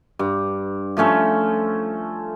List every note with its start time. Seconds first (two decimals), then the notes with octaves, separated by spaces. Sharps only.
0.19 G2
0.97 F3 A3 C#4 A4